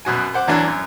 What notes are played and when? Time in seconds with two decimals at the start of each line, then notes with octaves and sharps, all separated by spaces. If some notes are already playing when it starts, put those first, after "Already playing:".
0.05 F#2 B2 F#4 G#5
0.34 C5 F#5 D6
0.48 E2 E3 F#3 D4
0.68 F#2